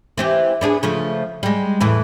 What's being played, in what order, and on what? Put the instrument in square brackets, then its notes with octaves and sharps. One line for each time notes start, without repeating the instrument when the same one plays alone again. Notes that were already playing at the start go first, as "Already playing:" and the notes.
[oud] E3 C4 G4
B3 D4 G#4
C#3 F3 A3
G3 G#3
E2 A2 E3